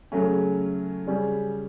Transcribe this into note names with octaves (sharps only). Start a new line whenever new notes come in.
C#3 F#3 A3 C#4
C#3 G3 C#4